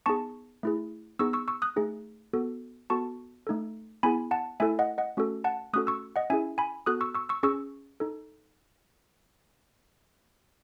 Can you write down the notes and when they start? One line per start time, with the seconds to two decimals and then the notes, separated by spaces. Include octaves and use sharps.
0.06 B3 D#4 G#4 A5 C#6
0.63 A3 E4 G#4
1.19 B3 D#4 G#4 C#6 E6
1.33 C#6 E6
1.48 C#6 E6
1.62 D#6 F#6
1.76 A3 D#4 G#4
2.33 B3 F#4 A4
2.90 B3 F#4 A4 A5 C#6
3.47 A3 D#4 A4
4.03 B3 E4 G#4 G#5 B5
4.31 F#5 A5
4.60 A3 E4 A4 E5 G#5
4.79 D#5 F#5
4.98 D#5 F#5
5.17 A3 C#4 F#4 A4
5.44 F#5 A5
5.73 A3 C#4 F#4 A4 D#6 F#6
5.87 C#6 E6
6.16 D#5 F#5
6.30 C#4 E4 G#4 E5 G#5
6.58 G#5 B5
6.86 B3 F#4 A4 D#6 F#6
7.01 C#6 E6
7.15 C#6 E6
7.29 C#6 E6
7.43 C#4 G#4 C#6 E6
8.00 D#4 A4